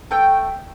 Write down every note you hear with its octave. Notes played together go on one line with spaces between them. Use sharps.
A3 G5